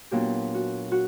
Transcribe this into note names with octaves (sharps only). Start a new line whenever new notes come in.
A#2 F#3 B3 D4 G4
F#4
F#4